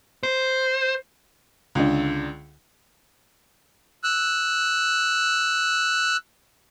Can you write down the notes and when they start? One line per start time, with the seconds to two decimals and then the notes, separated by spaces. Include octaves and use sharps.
0.23 C5
1.75 C#2 D3
4.04 E6 F#6